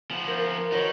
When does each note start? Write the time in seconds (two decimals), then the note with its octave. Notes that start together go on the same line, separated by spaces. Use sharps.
0.11 F3 B3
0.28 A#4 C5
0.72 D#3 D#4 F#4 B4 C#5